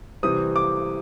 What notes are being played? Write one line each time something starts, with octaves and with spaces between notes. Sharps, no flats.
C3 E3 G3 C4 D#6
D6